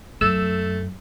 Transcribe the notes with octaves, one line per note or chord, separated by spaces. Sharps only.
F#2 A3 E6